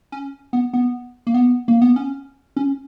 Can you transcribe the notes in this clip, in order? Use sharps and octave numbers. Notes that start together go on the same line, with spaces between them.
C#4
B3
B3
A#3
B3
A#3
B3
C#4
C#4